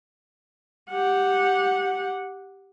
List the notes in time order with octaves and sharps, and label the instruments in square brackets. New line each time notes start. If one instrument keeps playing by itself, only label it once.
[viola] G4 F#5